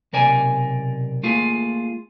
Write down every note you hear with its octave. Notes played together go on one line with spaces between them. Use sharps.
B1 C3 A#4 D5 G#5
A3 A#3 F4 G#4